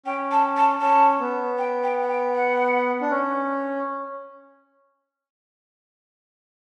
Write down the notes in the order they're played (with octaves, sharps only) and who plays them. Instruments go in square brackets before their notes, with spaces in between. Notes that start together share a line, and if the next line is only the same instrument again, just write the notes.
[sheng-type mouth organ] C#4 [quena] G5
[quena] A5
A5
[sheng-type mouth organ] C#4 [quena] A5
[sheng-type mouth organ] B3
[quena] G5
G5
F#5
G5
F#5
[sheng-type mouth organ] D4
C#4